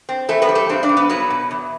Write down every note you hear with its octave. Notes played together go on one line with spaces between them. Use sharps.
C4
E3 A3 A4
B3 B4
G3
A3 A4
G2 C4 C5
D4 D5
G2
B3 B4
F#3 B3 B4
B2
E2